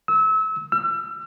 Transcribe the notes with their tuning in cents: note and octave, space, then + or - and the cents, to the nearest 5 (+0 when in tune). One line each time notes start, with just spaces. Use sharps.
E6 -30
E6 +40